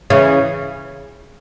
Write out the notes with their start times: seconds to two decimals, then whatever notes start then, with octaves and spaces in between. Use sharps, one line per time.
0.10 C#3 E3